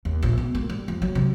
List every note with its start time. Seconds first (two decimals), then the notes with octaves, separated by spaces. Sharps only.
0.05 D#2
0.23 A#1
0.38 B2
0.55 A#3
0.70 G3
0.88 F2
1.02 F#3
1.15 C3